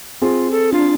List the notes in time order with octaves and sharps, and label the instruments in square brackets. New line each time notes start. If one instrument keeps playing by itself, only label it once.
[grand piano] C4 G#4 [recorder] F4
[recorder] A4
[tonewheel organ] D4 A6 [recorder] F4